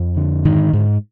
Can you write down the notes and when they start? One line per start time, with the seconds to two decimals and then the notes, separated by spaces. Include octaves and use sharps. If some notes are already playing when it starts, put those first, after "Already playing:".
Already playing: F2
0.17 D3
0.45 G#2 D#3
0.73 G#2